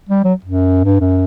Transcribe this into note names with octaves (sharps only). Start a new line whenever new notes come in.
G3
F#3
F#2
G2
F#2